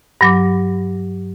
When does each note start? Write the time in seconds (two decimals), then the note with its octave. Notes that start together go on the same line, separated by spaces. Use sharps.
0.21 G2 F#3 D6